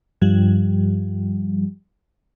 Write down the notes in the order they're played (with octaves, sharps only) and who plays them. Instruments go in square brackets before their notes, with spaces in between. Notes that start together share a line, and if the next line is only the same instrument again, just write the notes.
[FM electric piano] G2 F3 G3